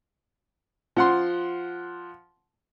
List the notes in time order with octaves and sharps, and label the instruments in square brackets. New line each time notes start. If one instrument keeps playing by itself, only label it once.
[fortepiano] F3 F#5 C6